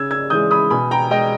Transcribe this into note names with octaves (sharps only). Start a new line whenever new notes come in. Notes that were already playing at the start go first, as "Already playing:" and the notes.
Already playing: C#3 E6 G#6
E6 G#6
E3 G#3 D#6 G6
B5 D#6
B2 G#5 B5
G5 A#5
G#3 D#5 G5